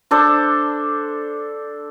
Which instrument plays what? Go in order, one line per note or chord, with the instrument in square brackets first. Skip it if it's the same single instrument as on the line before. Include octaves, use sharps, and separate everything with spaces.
[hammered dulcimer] D4 A4 C5